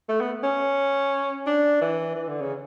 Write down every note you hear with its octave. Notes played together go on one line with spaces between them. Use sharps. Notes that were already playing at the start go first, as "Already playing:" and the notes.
A3
B3
C#4
D4
E3
E3
D3
C#3